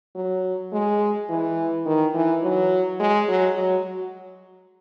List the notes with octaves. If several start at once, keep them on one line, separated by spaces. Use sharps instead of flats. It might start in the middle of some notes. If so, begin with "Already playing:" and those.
F#3
G#3
E3
D#3
E3
F#3
G#3
F#3
F#3